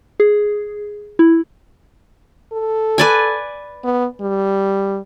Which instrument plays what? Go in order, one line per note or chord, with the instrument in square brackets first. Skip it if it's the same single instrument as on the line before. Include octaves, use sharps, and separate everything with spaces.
[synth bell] G#4
E4
[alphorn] A4
[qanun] B4 D5 G#5
[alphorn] B3
G3